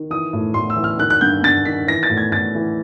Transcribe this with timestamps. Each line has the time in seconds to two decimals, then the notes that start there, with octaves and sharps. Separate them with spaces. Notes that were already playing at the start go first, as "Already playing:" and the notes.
Already playing: D#3
0.10 E3 D#6
0.33 A2
0.54 A2 C6
0.70 E6
0.76 E3
0.84 F6
0.99 D#3 F#6
1.10 F#6
1.21 G2 G6
1.43 G2 A6
1.65 D#3 B6
1.87 E3 A#6
2.03 A6
2.10 A2
2.17 G#6
2.32 A2 A6
2.55 E3